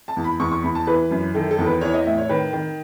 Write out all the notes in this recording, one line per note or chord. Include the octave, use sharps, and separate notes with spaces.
A5
E2
B5
E2 C#6
C#6
E2 B5
A5
E3 B4
F#2
D#3 A4
A4
E2
B4
E3 C#5
D#5
A2 E5
C#5
D#3 B4
D#3